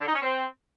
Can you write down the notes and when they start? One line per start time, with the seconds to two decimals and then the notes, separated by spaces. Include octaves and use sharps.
0.01 D3
0.08 D#4
0.15 C#4
0.22 C4